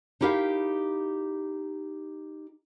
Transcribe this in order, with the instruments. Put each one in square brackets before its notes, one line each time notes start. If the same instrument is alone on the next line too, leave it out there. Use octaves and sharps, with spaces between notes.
[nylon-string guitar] D#4 E4 G4 A#4 F5